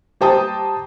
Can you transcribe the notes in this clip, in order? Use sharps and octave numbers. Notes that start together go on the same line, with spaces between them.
G4 C5 G5 A5 A#5 D#6